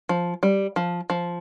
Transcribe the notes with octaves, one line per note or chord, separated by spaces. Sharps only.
F3
G3
F3
F3